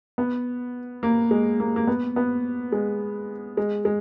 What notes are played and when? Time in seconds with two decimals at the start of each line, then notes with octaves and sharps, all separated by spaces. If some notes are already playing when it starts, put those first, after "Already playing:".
0.18 B3
1.03 A#3
1.31 G#3
1.60 A#3
1.76 A#3
1.87 B3
2.16 B3
2.72 G#3
3.57 G#3
3.85 G#3